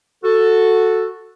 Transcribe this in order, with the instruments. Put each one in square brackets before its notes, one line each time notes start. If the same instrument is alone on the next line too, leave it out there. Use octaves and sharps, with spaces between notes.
[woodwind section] F#4 A4